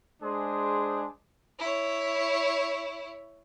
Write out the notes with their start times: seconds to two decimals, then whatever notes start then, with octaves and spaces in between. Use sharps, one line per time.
0.23 G#3 D4 G#4 C5
1.59 E4 C#5